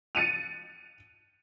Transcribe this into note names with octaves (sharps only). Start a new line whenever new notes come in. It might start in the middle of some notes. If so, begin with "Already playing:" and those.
A6 C#7 D#7 F7